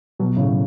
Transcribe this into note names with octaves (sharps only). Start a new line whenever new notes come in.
B2 F#3
A2 C#3